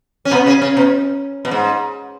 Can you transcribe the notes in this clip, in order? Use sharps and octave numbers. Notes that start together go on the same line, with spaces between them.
C#4
B2 B3
C#3 C#4
C#3 C#4
B2
B2
G#2